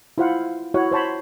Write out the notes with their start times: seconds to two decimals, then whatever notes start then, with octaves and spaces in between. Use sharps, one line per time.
0.18 E4 F4 C5 F5 F#5
0.74 E4 F#4 C#5 F#5
0.92 C5 C#5 A5 B5